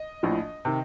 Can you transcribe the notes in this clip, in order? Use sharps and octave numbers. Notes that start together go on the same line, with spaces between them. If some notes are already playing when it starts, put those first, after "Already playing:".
Already playing: D#5
A#1 A2 F3
C3 D#3